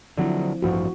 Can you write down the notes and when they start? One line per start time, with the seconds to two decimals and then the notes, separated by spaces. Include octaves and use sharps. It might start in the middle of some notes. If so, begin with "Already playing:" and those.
0.17 D3 F3 F#3 C4 E4
0.62 A1 G2 F3 F#4